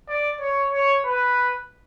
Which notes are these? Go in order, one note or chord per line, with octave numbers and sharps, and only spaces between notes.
D5
C#5
C#5
B4